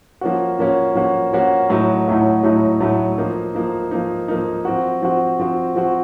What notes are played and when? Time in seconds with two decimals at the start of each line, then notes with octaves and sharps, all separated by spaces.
0.21 F3 A#3 C#4 F#4
0.59 F3 A#3 C#4 F#4
0.95 F3 A#3 C#4 F#4
1.33 F3 A#3 C#4 F#4
1.69 A2 F#3 A3 D#4 F#4
2.07 A2 F#3 A3 D#4 F#4
2.43 A2 F#3 A3 D#4 F#4
2.80 A2 F#3 A3 D#4 F#4
3.18 F3 A#3 D#4
3.55 F3 A#3 D#4
3.91 F3 A#3 D#4
4.28 F3 A#3 D#4
4.65 F3 C4 F#4
5.02 F3 C4 F#4
5.40 F3 C4 F#4
5.76 F3 C4 F#4